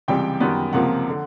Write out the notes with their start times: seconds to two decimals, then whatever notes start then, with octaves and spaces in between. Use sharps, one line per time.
0.08 C#2 C3 E3 G3 G5
0.40 F#2 D#3 G3 B3
0.73 C#2 C3 F3 A#3 F#5
1.09 D3